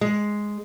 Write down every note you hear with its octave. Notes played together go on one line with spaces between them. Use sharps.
G#3